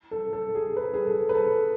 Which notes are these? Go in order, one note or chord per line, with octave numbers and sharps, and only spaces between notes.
A4
A4
G#4
B4
G#4
A4
B4
A4